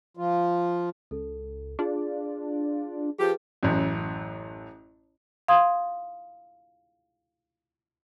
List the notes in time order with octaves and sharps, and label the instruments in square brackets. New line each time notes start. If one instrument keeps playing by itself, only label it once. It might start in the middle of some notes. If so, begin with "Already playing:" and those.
[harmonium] F3 F4
[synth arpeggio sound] C#2 [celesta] A4
[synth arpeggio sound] D4 F4 D5 [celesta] G#4
[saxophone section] F3 G4 [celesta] G#4 B4
[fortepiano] A1 F#2
[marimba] F5 C6 D#6 G#6